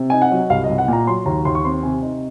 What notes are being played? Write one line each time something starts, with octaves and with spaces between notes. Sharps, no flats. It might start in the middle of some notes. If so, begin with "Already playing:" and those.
Already playing: C3
D#4 G#5
F#5
F#3
C2 F5
D#5
C2
F#5
A#2 A#5
F#3 C6
D#2 A#5
D#2 C6
C#6
C4 C6
C3 G#5
D#4